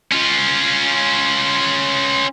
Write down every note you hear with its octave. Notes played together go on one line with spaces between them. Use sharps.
C#4 F4